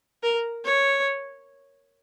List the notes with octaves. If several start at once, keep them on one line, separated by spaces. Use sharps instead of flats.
A#4
C#5